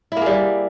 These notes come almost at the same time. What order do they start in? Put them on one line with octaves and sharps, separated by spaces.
E4 A#3 G#4 G3